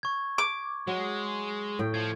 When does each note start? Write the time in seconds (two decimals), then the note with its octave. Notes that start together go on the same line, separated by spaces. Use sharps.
0.03 C#6 G#6
0.38 D6
0.87 F#3 G#3
1.79 A2 G5
1.94 F3 G#6